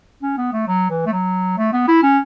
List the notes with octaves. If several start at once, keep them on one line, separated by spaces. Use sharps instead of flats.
C#4
B3
A3
F#3
E3
A3
F#3
A3
B3
E4
C#4